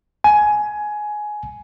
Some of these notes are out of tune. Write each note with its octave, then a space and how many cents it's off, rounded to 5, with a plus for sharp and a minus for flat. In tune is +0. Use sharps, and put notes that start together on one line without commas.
G#5 +15